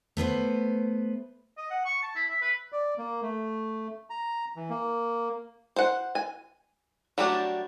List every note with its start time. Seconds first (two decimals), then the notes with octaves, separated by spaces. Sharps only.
0.17 A3 B3 B4 C5
1.58 D#5
1.70 F#5
1.86 C#6
2.03 A5
2.16 E4
2.31 E5
2.42 B4
2.72 D5
2.98 A#3
3.22 A3
4.10 A#5
4.56 E3
4.70 A#3
5.76 C5 F#5
6.15 G#5
7.18 F#3 G3 A3 D4 G4